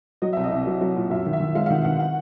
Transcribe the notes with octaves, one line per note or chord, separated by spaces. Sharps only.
F#3 D#5
C2 E5
D#5
C2
F#3
F#3
A#2
F#2 E5
D#3
E5
D#3
G#3 F5
F5
D#3 F#5
D#3 F#5
F#5